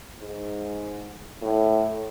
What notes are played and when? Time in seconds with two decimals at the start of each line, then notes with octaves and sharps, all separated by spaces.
0.19 G#2
1.42 A2